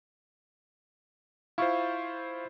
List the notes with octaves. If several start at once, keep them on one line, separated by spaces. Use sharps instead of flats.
E4 F4 C5 F5 C#6